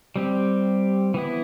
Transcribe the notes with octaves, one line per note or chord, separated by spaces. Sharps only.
G3 C4 G4
E3 B3 E4